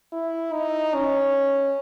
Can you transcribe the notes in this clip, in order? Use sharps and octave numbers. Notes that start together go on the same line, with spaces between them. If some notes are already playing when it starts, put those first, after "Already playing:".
E4
D#4
C#4